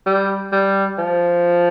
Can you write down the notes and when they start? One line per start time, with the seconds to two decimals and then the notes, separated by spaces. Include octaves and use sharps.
0.06 G3
0.52 G3
0.98 F3